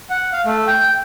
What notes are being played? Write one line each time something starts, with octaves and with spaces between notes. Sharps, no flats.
F#5
F5
A3
G5